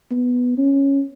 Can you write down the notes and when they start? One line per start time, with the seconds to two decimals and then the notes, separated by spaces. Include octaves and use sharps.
0.11 B3
0.58 C#4